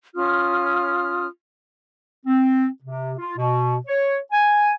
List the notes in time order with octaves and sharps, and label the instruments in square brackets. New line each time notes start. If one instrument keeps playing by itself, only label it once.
[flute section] C#4 F4 D#6 F6
[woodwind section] C4
C3
F4
B2
C#5
G#5